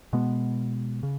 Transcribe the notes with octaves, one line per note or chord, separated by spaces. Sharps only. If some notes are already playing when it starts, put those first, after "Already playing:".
B2 G#3 B3
C#3